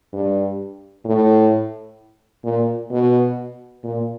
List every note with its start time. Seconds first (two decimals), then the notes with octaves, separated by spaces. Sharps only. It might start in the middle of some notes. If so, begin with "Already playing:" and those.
0.13 G2
1.05 A2
2.44 A#2
2.91 B2
3.84 A#2